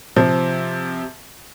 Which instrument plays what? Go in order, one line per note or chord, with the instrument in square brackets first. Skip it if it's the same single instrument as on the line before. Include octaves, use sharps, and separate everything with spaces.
[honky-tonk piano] C3 F3